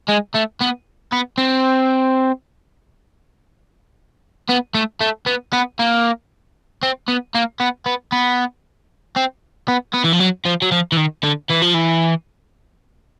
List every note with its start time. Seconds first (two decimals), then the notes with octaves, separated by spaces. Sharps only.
0.08 G#3
0.34 A3
0.61 B3
1.12 B3
1.38 C4
4.49 B3
4.74 A3
5.01 A3
5.26 B3
5.53 B3
5.79 A#3
6.83 C4
7.08 B3
7.35 A#3
7.60 B3
7.86 B3
8.12 B3
9.16 C4
9.68 B3
9.94 B3
10.05 E3
10.13 F3
10.20 F#3
10.46 F3
10.62 F#3
10.72 F3
10.92 E3
10.97 D#3
11.23 D3
11.50 E3
11.62 F3
11.74 E3